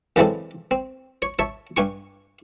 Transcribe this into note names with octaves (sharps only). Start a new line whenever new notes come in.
F#2 C#3 E3 G#3 C4 A4
C4
C#5
C#5 E5 A5
G2 G#5 C#6